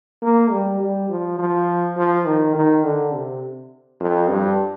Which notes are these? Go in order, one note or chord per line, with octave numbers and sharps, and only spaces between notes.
A#3
G3
G3
F3
F3
F3
D#3
D#3
D3
C3
F2
G2